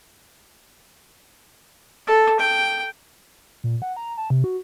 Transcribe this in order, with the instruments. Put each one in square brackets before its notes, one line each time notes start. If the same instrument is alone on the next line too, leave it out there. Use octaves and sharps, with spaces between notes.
[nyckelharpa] A4
G5
[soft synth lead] A#2
F#5
A#5
A5
C3
F#4